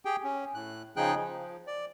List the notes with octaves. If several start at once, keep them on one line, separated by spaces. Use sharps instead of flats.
G4 G#4 G5
C#4
A2 F#6
C#3 F3 D#4 G#4 G5 F#6
F3
D5